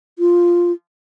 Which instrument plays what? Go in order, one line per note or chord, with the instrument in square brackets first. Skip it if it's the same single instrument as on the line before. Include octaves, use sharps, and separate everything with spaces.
[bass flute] F4